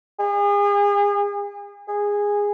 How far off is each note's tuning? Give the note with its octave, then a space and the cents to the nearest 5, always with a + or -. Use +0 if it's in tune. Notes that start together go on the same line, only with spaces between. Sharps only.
G#4 -35
G#4 -15